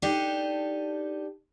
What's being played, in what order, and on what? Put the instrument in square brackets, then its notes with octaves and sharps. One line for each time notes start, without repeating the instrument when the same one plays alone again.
[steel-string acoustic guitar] D4 D#4 G4 A4